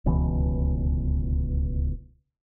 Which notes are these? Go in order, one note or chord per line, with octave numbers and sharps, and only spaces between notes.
D1 C#2 B2 E3